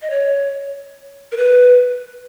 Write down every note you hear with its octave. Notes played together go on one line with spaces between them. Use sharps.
D#5
C#5
A#4
B4